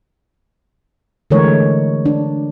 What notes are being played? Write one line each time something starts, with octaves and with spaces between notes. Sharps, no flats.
D3 E3 G#3 A3 A#4 C#5
D4